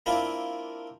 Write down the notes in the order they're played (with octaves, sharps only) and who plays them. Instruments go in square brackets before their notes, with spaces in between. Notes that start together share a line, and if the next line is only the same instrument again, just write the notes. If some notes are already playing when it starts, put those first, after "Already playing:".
[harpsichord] A#3 C4 D4 E4 F4 B5